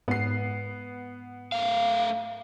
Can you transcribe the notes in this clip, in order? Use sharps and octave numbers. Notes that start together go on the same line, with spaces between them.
G#2 B3 C7
A3 F5